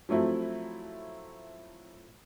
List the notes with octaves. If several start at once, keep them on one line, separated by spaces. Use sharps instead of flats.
F3 F#3 A3 C4 E4